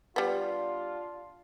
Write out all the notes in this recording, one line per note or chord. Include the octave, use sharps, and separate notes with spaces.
G3 B3 D4 F4